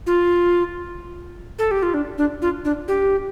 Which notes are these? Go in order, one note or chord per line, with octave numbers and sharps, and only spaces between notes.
F4
A4
G4
F4
D4
D4
F4
D4
G4